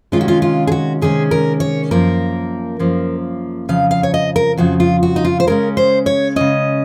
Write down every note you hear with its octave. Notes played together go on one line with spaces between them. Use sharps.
C3 D#3 G#3 C#4 F4
F#4
F4
F4
G#4
F#4
C3 D#3 G#3 C#4 G#4
A#4
C#5
F#2 F3 A#3 A#4
F#2 F3 A#3
F2 C#3 F3 F5
F5
C#5
D#5
A#4
F2 C#3 F3 F#4
F4
F#4
D#4
F4
C5
C#3 G#3 C#4 A#4
C5
C#5
C#3 G#3 C#4 D#5